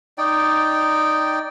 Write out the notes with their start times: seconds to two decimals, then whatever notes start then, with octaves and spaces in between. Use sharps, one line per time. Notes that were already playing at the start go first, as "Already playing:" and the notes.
0.18 D#4 D5 G5